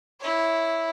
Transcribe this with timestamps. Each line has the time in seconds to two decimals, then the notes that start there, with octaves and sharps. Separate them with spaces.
0.20 E4 C#5